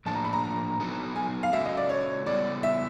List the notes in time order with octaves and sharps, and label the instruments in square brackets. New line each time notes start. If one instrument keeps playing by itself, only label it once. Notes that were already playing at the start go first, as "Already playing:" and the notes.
[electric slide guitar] A2 F3 A#3 D4 F4 [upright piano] A5
[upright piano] A#5
B5
A#5
[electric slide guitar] F#3 B3 D#4 F#4 A4
[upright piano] G#5
F5
[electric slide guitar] G#3 C#4 F#4 A4 [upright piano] E5
[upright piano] D#5
D5
C#5
[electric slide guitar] G3 B3 E4 A4 [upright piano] D5
[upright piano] E5